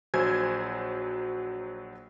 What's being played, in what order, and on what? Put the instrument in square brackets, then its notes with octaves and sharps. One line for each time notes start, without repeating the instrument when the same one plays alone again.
[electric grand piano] A#1 F#3 C5 G#5 G#6